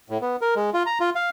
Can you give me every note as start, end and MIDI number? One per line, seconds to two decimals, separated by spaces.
0.10 0.18 45
0.22 0.36 59
0.41 0.54 70
0.56 0.70 56
0.74 0.83 65
0.86 0.98 82
1.00 1.10 65
1.15 1.30 77